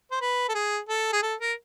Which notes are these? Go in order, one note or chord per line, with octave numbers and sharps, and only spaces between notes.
C5
B4
A4
G#4
A4
G#4
A4
A#4